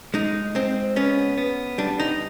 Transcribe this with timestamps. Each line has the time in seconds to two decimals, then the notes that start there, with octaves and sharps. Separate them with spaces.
0.14 G#3 D#4
0.55 G#3 C4
0.96 B3 C#4
1.38 B3
1.78 G3 D4
2.00 D#4